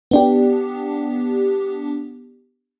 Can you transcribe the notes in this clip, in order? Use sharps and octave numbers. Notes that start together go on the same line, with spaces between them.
B3 D4 G4